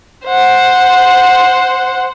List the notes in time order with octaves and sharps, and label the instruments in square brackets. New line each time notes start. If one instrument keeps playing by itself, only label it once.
[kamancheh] C5 F#5